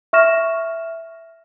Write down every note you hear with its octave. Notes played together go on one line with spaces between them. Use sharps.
E5 C#6 F6 A#6 E7